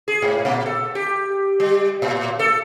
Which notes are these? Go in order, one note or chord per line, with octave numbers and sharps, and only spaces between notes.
G#4
G#2
A#2
A4
G4
G3
A2
A4